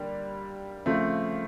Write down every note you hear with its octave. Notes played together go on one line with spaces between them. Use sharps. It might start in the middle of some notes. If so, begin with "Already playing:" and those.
Already playing: D3 G3 A#3
C#3 F3 A3 C4